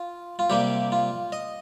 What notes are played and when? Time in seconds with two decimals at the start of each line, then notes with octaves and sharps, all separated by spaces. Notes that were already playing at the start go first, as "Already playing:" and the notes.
Already playing: F4
0.39 F4
0.50 C3 G3 A#3 G4
0.92 F4
1.32 D#5